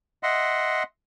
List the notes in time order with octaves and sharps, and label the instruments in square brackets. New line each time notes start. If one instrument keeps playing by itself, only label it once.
[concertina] D#5 E5 F#5 C6